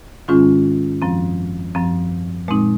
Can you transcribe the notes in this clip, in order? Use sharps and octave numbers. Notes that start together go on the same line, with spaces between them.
G#2 D#3 G#3 C#4 F4
F#2 F3 C4
F#2 F3 C4
A#2 G#3 C4 D#4